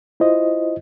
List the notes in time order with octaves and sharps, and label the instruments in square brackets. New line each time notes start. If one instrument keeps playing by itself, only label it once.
[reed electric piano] E4 F4 C5 D#5